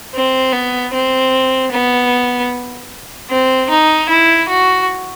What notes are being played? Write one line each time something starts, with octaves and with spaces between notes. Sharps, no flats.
C4
B3
C4
B3
C4
D#4
E4
F#4